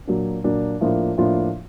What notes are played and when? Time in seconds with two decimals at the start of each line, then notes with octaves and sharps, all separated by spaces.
0.07 A#2 F#3 A#3 D4
0.44 A#2 F#3 A#3 D4
0.81 A2 F3 A#3 D4 F4
1.18 A2 F3 A#3 D4 F4